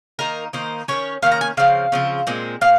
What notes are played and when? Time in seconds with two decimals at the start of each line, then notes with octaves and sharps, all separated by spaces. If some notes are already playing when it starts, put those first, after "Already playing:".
0.19 D#3 A#3 D#4 A#4
0.53 D#3 A#3 D#4 C5
0.88 D#3 A#3 C#4 C#5
1.22 D#3 A#3 C#4 F5
1.32 A#5
1.41 G#5
1.57 C#3 F3 C4 F5
1.92 C#3 F3 C4
2.27 A#2 G#3 C4
2.61 A#2 F5